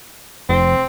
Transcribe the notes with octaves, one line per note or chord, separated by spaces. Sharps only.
F1 C4